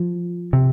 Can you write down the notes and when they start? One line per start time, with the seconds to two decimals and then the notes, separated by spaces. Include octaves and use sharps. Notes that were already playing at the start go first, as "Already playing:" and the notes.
Already playing: F3
0.53 C3